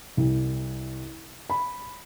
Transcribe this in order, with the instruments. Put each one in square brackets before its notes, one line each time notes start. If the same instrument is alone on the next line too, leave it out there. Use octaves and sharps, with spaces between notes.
[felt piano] C2
B5